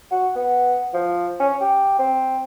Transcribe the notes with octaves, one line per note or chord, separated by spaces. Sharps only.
F#4
B3
F3
C#4
G4
C4